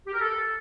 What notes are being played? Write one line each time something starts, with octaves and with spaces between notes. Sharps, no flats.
G4
A#4
A4